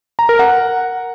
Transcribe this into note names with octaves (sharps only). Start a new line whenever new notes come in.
A#5
A#4
F#5